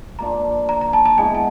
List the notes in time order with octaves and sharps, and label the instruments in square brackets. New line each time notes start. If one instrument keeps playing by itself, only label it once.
[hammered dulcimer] F3 A#3 D4 F4 [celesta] A#5
[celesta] A#5
A#5
A5
A5
[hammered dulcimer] G#3 B3 E4 [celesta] G#5
[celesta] A5